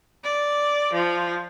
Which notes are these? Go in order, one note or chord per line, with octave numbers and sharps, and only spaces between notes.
D5
F3